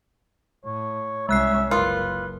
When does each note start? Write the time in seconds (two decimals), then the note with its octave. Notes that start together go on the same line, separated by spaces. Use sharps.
0.65 A2 C#5
1.29 C2 G#3 C#4 E5 F#6 C7
1.71 F#1 F4 A#4 B4